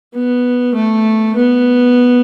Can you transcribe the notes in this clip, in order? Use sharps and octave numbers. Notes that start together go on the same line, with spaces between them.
B3
A3
B3